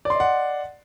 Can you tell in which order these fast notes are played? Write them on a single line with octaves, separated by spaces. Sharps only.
D5 C6 D#5 F#5